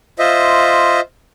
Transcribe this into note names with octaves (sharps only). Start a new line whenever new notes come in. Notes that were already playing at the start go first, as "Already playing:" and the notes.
F4 C5 D#5 E5